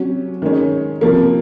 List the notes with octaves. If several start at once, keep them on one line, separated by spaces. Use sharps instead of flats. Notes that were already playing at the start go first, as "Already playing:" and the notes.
Already playing: C3 F#3 C#4
D#3 G#3 C#4
C3 F3 A#3